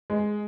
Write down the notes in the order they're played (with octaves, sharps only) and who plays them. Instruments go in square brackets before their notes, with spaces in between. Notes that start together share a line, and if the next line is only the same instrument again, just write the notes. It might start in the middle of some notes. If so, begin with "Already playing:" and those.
[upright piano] G#3